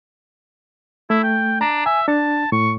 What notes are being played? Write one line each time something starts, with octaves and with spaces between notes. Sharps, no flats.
A3 E4
G5
D4 A#5
E5 G#5
D4 A5
A2 C#6